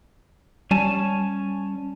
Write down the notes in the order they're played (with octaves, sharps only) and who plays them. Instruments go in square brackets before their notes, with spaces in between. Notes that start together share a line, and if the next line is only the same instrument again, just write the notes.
[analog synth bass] G3 [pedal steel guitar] C#4 G#5 A5